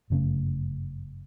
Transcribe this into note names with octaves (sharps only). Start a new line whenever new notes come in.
G1 F#2 C#3 A3